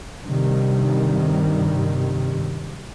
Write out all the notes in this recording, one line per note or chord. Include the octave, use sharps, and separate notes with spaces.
G2 C3 D#3 G3